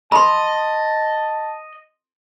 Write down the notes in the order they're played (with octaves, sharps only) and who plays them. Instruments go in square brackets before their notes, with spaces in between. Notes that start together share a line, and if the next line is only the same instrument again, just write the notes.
[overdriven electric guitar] D#5 [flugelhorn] A5 [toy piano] B5 C6